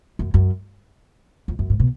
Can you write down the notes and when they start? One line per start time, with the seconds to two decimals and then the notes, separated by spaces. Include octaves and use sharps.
0.19 F#2
0.34 F#2
1.48 F2
1.59 F#2
1.70 G#2
1.80 B2